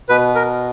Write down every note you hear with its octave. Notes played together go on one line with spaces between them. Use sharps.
B2 B4
A#4